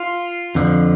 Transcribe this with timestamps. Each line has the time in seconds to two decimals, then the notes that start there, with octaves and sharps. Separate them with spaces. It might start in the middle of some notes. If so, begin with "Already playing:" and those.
Already playing: F4
0.55 F2 D3 F3